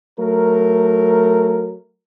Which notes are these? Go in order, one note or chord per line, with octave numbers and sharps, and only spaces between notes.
F#3 A3 A#4